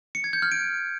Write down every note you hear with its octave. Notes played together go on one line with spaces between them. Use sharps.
C#7
G#6
G6
F6
D7